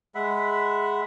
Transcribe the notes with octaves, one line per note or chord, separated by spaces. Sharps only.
G#3 E5 F#5 B5